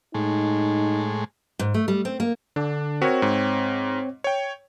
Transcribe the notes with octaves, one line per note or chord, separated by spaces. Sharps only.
A2 G#3 D#4
G#2
A3
G3
C4
A#3
D3 D4
C4 F#4 A#4 C#5 C#6
G#2
C#5 G5